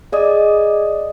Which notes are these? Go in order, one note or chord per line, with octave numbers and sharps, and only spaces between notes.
G#4 D5 D#5 D#6